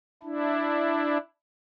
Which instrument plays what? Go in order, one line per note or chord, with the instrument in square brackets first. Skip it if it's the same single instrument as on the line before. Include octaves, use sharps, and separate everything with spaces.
[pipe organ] D4 E4